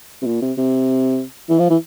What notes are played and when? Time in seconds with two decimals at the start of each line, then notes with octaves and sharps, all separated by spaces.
0.22 C3
0.26 A#2
0.42 C3
0.58 C3
1.49 E3
1.59 F3
1.70 E3